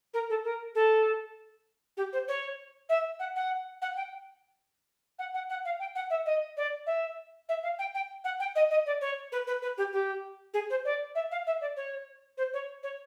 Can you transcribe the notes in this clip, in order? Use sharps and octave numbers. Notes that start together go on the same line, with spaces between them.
A#4
A4
A#4
A4
G4
C5
C#5
E5
F#5
F#5
F#5
G5
F#5
F#5
F#5
F5
G5
F#5
E5
D#5
D5
E5
E5
F5
G5
G5
F#5
G5
D#5
D#5
D5
C#5
B4
B4
B4
G4
G4
G#4
C5
D5
E5
F5
E5
D5
C#5
C5
C#5
C#5